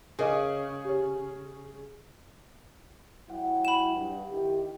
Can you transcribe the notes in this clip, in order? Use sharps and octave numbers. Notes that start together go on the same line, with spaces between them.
C#3 G#4 A#4 D#5 D6
G4 C#5
F#3 E4 F#5 G5
B5 E7
G2
D#3 E4 G4